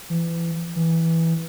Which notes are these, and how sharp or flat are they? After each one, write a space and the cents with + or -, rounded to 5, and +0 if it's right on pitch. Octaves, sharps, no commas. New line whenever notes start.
E3 +30
E3 -5